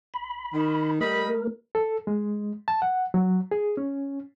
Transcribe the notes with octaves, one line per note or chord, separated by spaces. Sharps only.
B5
D#3
G3 A3 A#4 D#5 B5
A4
G#3
A5
F#5
F#3
G#4
C#4